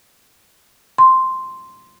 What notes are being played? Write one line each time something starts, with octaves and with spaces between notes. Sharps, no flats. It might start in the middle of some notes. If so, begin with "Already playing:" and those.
C6